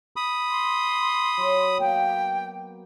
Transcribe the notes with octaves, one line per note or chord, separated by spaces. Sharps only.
B5 D#6
C6
F#3
A#3 B3 G5